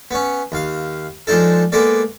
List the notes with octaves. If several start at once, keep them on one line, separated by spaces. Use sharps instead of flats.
B3 C#4
D#2 F5
F3 G#3 D4 D#4 A4
G#3 A#3 B3 A4 D5